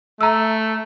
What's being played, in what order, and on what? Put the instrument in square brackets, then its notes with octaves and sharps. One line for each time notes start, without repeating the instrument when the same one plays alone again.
[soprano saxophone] A3 [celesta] A#5 E6